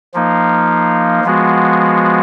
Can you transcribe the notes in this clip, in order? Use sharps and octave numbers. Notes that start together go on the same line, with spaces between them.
F3 A#3 D#4
F3 G#3 B3 F#4